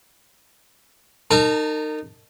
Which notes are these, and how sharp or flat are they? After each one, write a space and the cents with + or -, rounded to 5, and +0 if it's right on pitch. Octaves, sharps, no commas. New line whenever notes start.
D#4 -20 A#4 -35 A5 +0